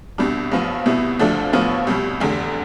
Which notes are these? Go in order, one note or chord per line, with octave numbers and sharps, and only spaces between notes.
C2 B2 G3 D4
A1 G2 F3 B3
C2 B2 B3 E4
D2 D3 F3 A3 D4
A1 A2 F3 B3 F4
C2 B2 G3
F1 E2 D3